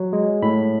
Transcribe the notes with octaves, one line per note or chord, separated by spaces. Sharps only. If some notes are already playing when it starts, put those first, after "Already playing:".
Already playing: F#3
G#3
A2 B5